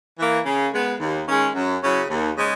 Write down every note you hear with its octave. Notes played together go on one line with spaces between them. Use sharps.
E3 A#3
C#3
G#3 B3
D#2
D#3 G#3 C#4
F#2
C#3 F#3 C#4 E4
D#2
C#3 G#3